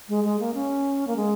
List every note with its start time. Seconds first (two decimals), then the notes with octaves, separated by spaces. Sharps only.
0.09 G#3
0.24 G#3
0.39 A#3
0.54 C#4
1.07 A#3
1.16 G#3